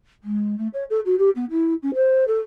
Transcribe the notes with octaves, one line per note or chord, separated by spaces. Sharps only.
G#3
A3
C#5
A4
F#4
G4
B3
E4
C#4
C5
A4